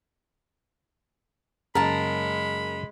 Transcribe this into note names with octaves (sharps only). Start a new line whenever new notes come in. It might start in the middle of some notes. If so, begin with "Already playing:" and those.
F#2 C#3 G#3 A#3 A#4 A5 B5